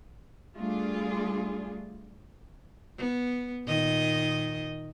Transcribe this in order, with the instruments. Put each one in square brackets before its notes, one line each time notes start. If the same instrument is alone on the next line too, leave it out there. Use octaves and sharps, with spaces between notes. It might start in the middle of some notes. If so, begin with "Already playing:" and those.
[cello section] G3 A3 D4 F4 G#4
[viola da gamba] B3
A#2 D#3 D#5